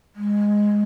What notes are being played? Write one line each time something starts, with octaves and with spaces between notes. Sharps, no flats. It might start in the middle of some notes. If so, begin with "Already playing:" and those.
G#3